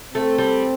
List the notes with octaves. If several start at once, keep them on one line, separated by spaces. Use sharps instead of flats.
A3 C4
G3